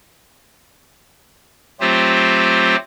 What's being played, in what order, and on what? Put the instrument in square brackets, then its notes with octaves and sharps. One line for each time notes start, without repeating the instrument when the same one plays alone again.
[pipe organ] F#3 A3 C4 F4 G4 C5